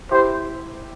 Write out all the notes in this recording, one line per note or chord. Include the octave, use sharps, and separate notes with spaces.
E4 G4 C5